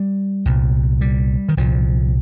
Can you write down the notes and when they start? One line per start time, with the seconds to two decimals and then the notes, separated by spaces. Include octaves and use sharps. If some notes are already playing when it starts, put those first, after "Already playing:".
Already playing: G3
0.45 C2 A#2
1.01 G3
1.49 D#3
1.57 C2 A#2 F3